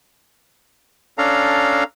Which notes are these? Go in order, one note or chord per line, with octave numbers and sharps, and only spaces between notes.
C#4 D4 A4 F5 A#5